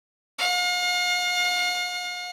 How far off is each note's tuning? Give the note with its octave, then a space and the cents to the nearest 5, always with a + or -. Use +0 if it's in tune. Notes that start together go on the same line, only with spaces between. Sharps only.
F5 +40